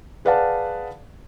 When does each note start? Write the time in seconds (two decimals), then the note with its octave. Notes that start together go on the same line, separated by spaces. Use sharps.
0.25 G#4 B4 D5 F5 F#5 A5